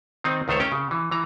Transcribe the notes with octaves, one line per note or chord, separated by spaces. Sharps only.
D#3 C4 D#4
C#2 D#3 A3 C5 C#5
C#4 G4 G5
C#3
E3
E3 A#5